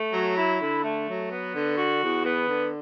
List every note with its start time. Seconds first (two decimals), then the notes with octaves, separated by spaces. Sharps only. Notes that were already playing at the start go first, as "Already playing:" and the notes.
Already playing: A3
0.12 F#3
0.37 E4
0.60 D3
0.84 A3
1.08 F#3
1.31 B3
1.54 D3
1.77 F#4
2.01 E2
2.25 B3
2.48 D3